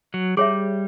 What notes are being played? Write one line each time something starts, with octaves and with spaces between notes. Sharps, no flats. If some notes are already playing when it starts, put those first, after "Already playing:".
F#3
G3 G#4 C#5 E5